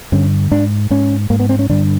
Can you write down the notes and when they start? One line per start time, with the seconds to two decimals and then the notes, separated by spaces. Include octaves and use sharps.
0.12 G2 D3 C#4
0.51 G#2 D4
0.90 G#2 C#4
1.30 G#2 A#3
1.40 B3
1.49 C4
1.59 C#4
1.69 G2 D3 D4